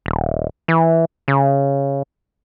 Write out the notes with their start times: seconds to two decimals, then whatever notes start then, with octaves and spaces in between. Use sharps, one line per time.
0.06 D#1
0.68 E3
1.28 C#3